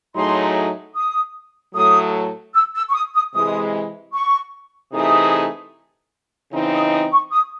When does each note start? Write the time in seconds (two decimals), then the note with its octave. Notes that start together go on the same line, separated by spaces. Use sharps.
0.15 A2 F#3 A3 D#4 G#4 C6
0.95 D#6
1.74 A2 F#3 A3 D#6
2.54 E6
2.74 E6
2.89 C#6
2.93 D#6
3.14 D#6
3.33 C3 E3 G#3 D#6
4.13 C#6
4.93 C3 E3 A3 D#4 G#4 D#6
6.53 C#3 E3 C4 D#4
6.72 D#6
6.92 D#6
7.12 C#6
7.32 D#6